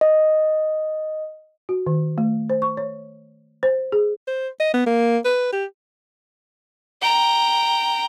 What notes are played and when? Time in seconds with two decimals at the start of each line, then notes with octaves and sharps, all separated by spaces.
0.01 D#5
1.69 F#4
1.87 D#3
2.18 A3
2.50 C5
2.62 C#6
2.77 C#5
3.63 C5
3.92 G#4
4.28 C5
4.60 D#5
4.74 B3
4.86 A#3
5.25 B4
5.53 G4
7.02 G5 A#5